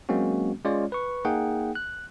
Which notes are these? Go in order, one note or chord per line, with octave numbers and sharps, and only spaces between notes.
F#3 G#3 A#3 C4 C#4 F#4
G#3 C#4 F4 C#5 D5
B4 C#6
A#3 D#4 G#4 F#5 G5
F#6